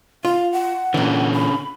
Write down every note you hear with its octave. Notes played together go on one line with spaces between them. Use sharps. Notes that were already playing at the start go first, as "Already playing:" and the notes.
F4 F5
F#5
A#2 D3 E3 C#4
B5